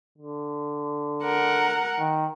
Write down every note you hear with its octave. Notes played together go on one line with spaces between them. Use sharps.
D3
A#4 F#5
D#3